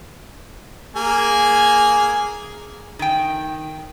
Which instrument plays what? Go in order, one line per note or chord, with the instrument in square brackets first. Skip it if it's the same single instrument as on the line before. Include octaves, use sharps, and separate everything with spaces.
[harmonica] A#3 G#4 G#5
[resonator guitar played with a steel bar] D#3 G5